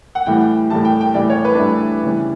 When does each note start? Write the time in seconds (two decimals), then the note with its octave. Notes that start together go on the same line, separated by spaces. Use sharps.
0.15 F#5
0.26 A2 E3 G3 G5
0.70 A2 E3 G3 A5
0.85 G5
1.01 G5
1.14 A2 E3 G3 D5
1.30 C#5
1.45 B4
1.55 D4
1.59 A2 E3 G3 E4
2.03 C#3 E3 G3